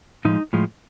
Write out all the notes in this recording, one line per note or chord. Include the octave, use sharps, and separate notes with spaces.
A2 F3 G#3 D#4
A2 F3 G#3